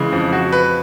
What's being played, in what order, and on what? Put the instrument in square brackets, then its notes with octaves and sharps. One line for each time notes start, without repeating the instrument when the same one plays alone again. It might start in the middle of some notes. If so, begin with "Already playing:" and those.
Already playing: [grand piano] C#3 E3 G#3
F2
F#4
B4